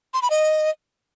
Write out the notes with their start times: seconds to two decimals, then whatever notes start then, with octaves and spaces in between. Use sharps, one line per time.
0.14 C6
0.22 B5
0.30 D#5